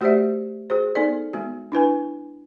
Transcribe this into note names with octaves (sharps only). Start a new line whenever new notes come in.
A3 F#4 G4 C5 D5 E5
F#4 G#4 C5
B3 D#4 A4 D5
G#3 B3 F#4
D4 E4 B4 G#5